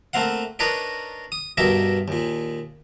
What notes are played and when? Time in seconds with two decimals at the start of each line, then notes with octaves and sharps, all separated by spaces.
0.13 A3 A#3 C4 F5 F#5
0.59 D4 D#4 A#4 B4 C#5 D5
1.32 D#6
1.57 G2 B2 D#4 A#4 E5 D6
2.08 D#2 A#2